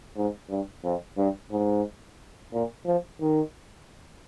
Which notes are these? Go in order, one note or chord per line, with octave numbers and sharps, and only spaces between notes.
G#2
G2
F2
G2
G#2
A#2
F3
D#3